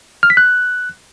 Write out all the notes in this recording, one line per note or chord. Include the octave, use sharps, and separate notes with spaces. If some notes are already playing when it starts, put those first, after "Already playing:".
F6
B6
F#6